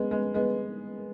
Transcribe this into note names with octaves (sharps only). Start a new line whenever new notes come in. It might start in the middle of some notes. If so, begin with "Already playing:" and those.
Already playing: G#3 B3
G#3 B3
G#3 B3